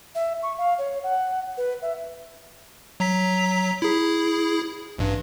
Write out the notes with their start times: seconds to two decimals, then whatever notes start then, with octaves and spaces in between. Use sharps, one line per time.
0.15 E5
0.43 C#6
0.58 F5
0.78 C#5
1.03 F#5
1.58 B4
1.82 E5
3.00 F#3 A#5 B6
3.82 E4 G#4
4.99 A1 G2